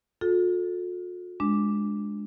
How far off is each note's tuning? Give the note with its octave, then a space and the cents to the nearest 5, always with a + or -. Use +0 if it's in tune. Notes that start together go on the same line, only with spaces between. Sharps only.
F4 +45 A4 +0
G#3 +0 D4 +0